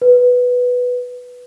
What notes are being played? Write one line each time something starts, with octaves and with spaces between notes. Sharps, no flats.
B4